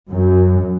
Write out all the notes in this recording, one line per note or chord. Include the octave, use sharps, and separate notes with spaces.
F#2